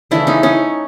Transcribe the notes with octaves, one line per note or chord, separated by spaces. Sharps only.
C#3 E3 A3 D4 E4
C#4 D#4
C#4 D#4